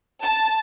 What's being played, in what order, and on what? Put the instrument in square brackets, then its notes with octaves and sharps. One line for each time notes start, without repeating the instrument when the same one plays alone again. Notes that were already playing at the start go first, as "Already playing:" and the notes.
[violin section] A5